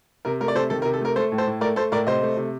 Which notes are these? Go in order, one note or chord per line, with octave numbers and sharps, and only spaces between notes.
C3 A#4
A3 A#4
D5
C3 A4 C5
D#3 A4
A#4
C3
A4
A3 A#4
A3 A4 C5
A2
A4 C5
A2
A3 A#4 D5
A3 A4 C5
A2 A#4 D5
C3 C5 D#5
A3
C3